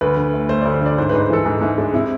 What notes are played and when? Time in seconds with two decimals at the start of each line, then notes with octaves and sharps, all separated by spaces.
0.01 D2 B4
0.17 D3
0.33 A3
0.49 A3 C5
0.61 D2 D5
0.74 C5
0.81 D3 D5
0.98 G#2 C5
1.09 B4
1.14 G#2 C5
1.22 B4
1.30 E3 A4
1.45 G#2 G#4
1.61 G#2 E4
1.78 G#3 D4
1.94 C3 E4